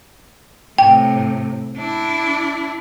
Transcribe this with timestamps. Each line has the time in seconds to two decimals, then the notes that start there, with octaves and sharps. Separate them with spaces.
0.78 A2 C3 G5
1.77 D4 E4